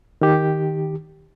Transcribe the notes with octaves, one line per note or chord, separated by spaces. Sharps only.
D#3 G4